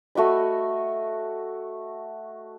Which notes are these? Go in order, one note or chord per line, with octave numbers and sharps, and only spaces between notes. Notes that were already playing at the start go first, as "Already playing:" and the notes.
A3 F#4 D#5 B5